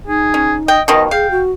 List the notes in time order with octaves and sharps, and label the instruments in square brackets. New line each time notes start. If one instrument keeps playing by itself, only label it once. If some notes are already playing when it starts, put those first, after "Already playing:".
[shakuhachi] D#4 [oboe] G#4
[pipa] C#4
[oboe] D#5 [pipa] G5
[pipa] B2 D#3 F3 [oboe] D#5
[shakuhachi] G#4 [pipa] F5 [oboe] G5
[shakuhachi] F#4